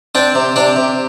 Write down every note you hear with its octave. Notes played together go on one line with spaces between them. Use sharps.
C4 D4 D5
C3
C3 D4 D5
C3